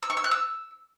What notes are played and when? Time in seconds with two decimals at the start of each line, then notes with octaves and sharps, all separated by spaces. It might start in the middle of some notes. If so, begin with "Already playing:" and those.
0.03 E6
0.10 C#6
0.17 E6
0.24 F#6
0.31 E6